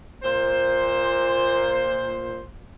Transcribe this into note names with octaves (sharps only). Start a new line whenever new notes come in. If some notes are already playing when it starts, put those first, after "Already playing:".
A#2 C5